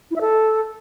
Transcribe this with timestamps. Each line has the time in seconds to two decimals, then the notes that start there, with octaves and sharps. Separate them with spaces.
0.11 E4
0.16 E5
0.21 A4